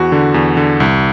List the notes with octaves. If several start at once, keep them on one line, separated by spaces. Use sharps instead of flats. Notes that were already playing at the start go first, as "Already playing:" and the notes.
Already playing: E2 F#4
D3
E2
D3
C2